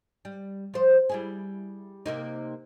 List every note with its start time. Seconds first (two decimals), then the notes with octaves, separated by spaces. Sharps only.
0.25 G3
0.74 F3 C5
1.09 G3 E4 G#4
2.06 C3 A#3 D#4